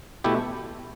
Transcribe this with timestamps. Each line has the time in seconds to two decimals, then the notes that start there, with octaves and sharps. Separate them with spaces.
0.24 B2 A3 E4 G4